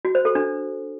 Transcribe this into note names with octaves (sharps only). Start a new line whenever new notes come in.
F#4
C5
A4
D4